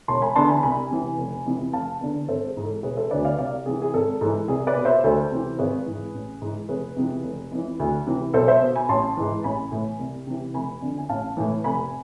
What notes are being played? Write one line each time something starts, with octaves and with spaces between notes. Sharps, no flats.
E1 A5 C6
G#5 B5
E2 D3 A5 C6
G#5 B5
C2 G#5 B5
C3 E3
F1
F2 C3 E3
F1 F5 A5
E2 D3
G#1 A4 C5
G#4
G#2 E3
A4
E1 G#4 B4
A4 C5
D2 D3 B4 D5
D5 F5
C2 D5 F5
C3 E3 G#4
G#4
G#1 A4
G#2 E3 A4
C2 G#4
B4 D5
B2
C5 E5
D2 A4 C5
C3 E3
G#1 G#4 B4
G#2 E3
A1
G#2 E3
F1 G#4 B4
F2 C3 E3
F1
F2 E3
D2
C3 E3
B1 A4 C5
C5 E5
B2
G#5 B5
A1 A5 C6
G#2 E3
A1 G#5 B5
A2 E3
C2
C3 E3
F1 G#5 B5
F2 D3
G#5
A1 F5 A5
A2 E3
F1 G#5 B5